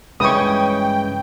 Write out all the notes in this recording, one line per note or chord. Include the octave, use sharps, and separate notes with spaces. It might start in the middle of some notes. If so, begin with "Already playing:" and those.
G2 C#3 E3 G#3 C#4 G5 C#6 D#6